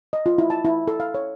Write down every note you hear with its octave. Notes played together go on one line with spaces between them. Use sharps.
D#5
F4
E4
A5
E4
A4
F5
C#5